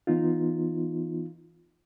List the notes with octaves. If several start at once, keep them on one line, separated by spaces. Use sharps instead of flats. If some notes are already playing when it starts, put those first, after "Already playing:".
E3 B3 D#4 F4